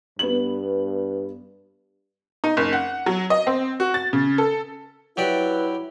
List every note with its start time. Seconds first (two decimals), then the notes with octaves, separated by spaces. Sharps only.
0.19 G2 B3 F#7
2.44 D#4
2.57 F#1
2.73 F#5
3.06 F#3
3.30 D#5
3.47 C4
3.80 F#4
3.94 A6
4.13 C#3
4.38 A4
5.17 F#3 E4 G4 B4 D5